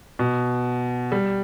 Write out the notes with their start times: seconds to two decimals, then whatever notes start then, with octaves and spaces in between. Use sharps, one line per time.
0.19 B2
1.12 G3